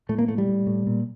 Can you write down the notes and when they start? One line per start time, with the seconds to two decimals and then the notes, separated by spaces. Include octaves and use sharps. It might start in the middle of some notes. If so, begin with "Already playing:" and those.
0.09 A2 A3
0.18 A#3
0.28 A2 A3
0.38 G3
0.48 A2
0.67 A2
0.87 A#2